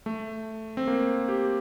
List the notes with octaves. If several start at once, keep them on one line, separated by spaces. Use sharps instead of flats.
A3
C4
A#3
G4